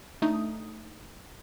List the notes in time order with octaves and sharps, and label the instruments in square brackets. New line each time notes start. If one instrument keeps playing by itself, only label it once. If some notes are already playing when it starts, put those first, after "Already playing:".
[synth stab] A3 D4 D#4 D#6